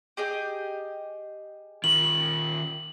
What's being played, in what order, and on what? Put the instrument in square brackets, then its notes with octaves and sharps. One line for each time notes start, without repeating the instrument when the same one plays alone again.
[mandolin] G4 G#4 D#5
[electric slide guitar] D#3 F4 A#4 [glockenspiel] F#7